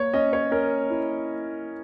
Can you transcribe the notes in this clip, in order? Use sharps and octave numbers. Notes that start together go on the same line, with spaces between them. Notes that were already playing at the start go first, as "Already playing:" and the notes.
Already playing: A#3 C#5
C#4 D#5
C#5
C#4 A#4
E4